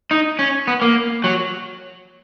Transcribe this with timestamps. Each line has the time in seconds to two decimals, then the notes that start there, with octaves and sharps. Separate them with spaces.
0.11 D#4
0.39 C#4
0.68 B3
0.82 A#3
1.24 F#3